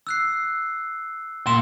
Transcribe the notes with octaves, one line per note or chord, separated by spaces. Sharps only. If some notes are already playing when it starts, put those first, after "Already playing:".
E6 F#6 C7
A#2 C6 E7